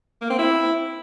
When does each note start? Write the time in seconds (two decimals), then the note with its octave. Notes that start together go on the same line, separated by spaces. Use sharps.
0.22 A#3
0.30 C4
0.39 E4